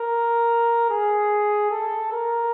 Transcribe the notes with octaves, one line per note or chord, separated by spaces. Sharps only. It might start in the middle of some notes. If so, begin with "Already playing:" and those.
Already playing: A#4
G#4
A4
A#4